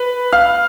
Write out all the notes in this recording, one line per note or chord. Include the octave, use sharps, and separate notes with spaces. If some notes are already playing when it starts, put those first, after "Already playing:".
Already playing: B4
F5 F6